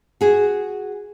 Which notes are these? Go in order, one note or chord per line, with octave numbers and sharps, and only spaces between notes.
F#4 G#4